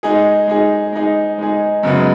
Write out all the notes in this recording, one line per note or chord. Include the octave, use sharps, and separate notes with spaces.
G#3 D#4 G#4
G#3 D#4 G#4
G#3 D#4 G#4
G#3 D#4 G#4
F#2 C#3 G#3 B3